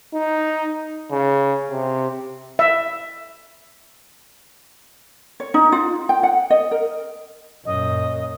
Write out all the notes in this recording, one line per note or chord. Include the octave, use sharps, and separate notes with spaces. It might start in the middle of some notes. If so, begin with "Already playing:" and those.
D#4
C#3
C3
E5
C#5
D#4
F4
G5
F#5
D#5
A#4
F#2 A#2 D#5